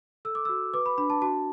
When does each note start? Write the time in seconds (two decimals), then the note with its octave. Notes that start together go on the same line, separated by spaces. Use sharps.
0.25 A4 E6
0.35 D6
0.45 F#4 E6
0.74 B4 D6
0.86 B5
0.98 D4 B5
1.10 A5
1.22 F#4 A5